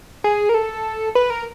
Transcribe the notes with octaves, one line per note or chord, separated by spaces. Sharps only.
G#4
A#4
A4
B4
A#4